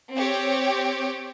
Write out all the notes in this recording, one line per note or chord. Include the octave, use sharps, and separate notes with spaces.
C4 G4 C#5